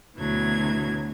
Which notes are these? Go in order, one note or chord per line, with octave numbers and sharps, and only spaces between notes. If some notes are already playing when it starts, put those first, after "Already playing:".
D2 B2 E3 F#3 G#6